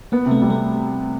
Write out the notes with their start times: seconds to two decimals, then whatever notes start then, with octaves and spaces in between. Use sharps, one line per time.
0.12 A#3 B3
0.26 C3
0.31 A3
0.42 G3
0.50 A3